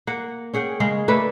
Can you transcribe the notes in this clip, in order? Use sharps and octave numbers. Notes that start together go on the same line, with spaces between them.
A#3 F#5
C#4 G#4 F#5 G5
C#3 G#3 G#4 F5
A3 A#3 D4 B4